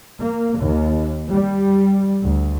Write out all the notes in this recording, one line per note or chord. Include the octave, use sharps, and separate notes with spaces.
A#3
D#2
G3
D2